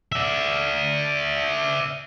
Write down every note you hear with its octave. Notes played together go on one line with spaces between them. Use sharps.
D5 E5